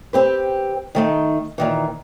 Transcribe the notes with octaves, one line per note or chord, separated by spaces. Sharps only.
C4 G4 B4
D#3 A3 D#4
A#2 D#3 E3